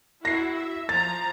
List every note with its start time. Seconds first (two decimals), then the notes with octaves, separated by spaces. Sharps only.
0.25 E4 F#4 A#6 C7
0.55 E5
0.89 F3 A#5 A6